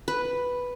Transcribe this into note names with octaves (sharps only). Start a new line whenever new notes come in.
B4